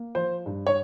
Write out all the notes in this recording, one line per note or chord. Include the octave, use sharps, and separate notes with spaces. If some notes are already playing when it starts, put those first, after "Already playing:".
Already playing: A#3
F3 C5
G2
C#5